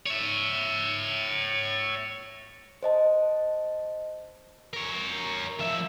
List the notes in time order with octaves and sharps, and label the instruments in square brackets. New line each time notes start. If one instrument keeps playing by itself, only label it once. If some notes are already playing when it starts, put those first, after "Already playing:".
[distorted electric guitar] C#5 E5
[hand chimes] C5 D#5 A5
[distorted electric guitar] A#4 C#5
F3 E5